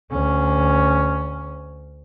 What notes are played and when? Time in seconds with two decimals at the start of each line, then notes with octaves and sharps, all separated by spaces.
0.11 D2 C#4